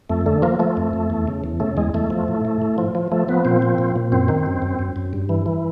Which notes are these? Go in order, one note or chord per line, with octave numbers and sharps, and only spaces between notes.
F2 A3
D3 A3
F3 A#3
F3 A3
F2
F2
E2
C#3
E2
C#3 A3
E2 G#3
E2 A3
F3
A2
A2
A2
F3
F3
F3 A3
F3 B3
A#2 C4
F3
A#2
A#2
F#2 C4
D#3
F#2
F#2
F#2
F#2
G2
E3
E3